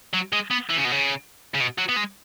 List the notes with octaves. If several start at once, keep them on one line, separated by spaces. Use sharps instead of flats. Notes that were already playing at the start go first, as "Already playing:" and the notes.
F#3
G#3
B3
E3
C#3
B2
C#3
C#3
B2
F#3
B3
G#3